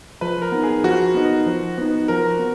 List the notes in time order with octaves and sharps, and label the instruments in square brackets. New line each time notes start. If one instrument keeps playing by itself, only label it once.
[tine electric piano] F3 [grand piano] B4
[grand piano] A#4
[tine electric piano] B3 D#4
[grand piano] G#4
[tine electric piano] F3 [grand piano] F#4
[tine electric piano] B3 D#4
F3
B3 D#4
[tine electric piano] F3 [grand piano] A#4
[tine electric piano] B3